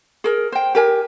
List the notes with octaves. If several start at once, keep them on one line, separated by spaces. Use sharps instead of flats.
G#4 A#4
C5 G5
G4 A#4 G#5